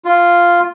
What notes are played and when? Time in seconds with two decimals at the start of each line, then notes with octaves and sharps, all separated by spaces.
0.05 F4